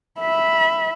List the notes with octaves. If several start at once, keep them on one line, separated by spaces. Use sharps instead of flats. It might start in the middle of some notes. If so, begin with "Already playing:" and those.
E5 B5